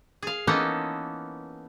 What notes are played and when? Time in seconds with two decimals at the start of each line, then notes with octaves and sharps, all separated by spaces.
0.23 G#4 F5
0.47 E3 A#3 B3 C#4 D#4 A4